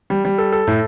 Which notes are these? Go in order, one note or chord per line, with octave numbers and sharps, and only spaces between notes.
G3
G3
A4
A4
A2